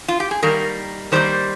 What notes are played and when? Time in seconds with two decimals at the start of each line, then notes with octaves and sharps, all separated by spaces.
0.08 F4
0.20 G4
0.31 G#4
0.43 D#3 G3 A#3 A#4
1.12 D#3 G3 A#3 C5